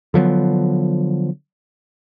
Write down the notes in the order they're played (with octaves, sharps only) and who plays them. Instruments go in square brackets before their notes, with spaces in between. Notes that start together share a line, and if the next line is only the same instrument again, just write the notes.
[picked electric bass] D3 F3 F#3 B3